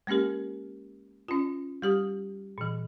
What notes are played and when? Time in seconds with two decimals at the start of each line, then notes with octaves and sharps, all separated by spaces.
0.07 G#3 A#3 C#4 G4 A#4
1.28 C#4 F4
1.82 G3 G4 D#6
2.58 A#2 E3